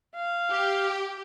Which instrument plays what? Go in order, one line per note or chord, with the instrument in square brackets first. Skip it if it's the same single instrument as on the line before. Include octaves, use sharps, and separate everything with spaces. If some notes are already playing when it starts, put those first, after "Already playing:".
[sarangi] F5
[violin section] G4